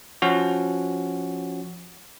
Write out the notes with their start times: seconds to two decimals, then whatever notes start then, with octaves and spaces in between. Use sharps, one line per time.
0.22 F3 C#4 F#4